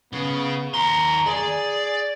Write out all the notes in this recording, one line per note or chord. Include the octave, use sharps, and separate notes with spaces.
C#3 B3
D#2 A#5 C6
G#4 D5